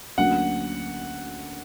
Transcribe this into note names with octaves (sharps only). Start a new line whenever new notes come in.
D2 D3 F#3 A#3 C#4 F#5